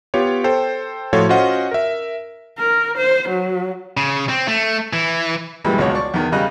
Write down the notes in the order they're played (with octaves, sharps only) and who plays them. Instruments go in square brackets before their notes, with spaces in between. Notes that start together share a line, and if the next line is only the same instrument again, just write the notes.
[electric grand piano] B3 F4 G4 C#5
A4 C5 G5
A2 F3 F4 F#4 A4 C#5
C#4 F4 F#4 C5 D#5 F#5
A#4 E5
[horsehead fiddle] A#4
C5
F#3
[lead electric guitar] C#3
C4
A3
E3
[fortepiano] F#2 A#2 E3 G3 G#3
G#1 C#2 B2 F#4 C#5
D5 C#6
E2 D#3
C#3 G3 D#5 F5 F#6